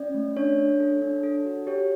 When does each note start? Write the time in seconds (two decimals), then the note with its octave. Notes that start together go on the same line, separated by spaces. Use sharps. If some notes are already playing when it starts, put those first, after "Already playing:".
Already playing: C#4 D5
0.14 A3
0.36 D4 C#5
0.58 D4
0.80 A4
1.02 D4
1.23 A4
1.45 F#4
1.67 G4 C#5